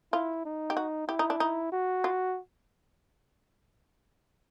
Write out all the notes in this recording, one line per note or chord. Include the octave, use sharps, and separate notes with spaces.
E4 F4
D#4
G4
F#4
E4 G4
D#4
D4
D#4
F#4
F4